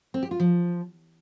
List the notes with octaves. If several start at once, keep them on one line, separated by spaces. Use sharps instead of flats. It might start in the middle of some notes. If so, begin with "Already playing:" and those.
C4
G4
F4
F3